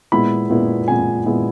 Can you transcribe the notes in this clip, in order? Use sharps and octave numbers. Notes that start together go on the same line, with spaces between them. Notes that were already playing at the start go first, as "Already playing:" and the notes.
A#2 G#3 B3 E4 B5
A#2 G#3 B3 E4
A#2 G#3 B3 E4 G#5
A#2 G#3 B3 E4